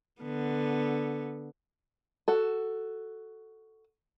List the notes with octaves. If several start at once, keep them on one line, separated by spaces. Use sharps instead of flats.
D3 B3
F#4 A4